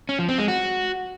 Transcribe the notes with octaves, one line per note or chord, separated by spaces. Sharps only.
C#4
F3
C4
G#3
F#4